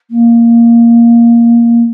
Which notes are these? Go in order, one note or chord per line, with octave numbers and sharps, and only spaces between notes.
A#3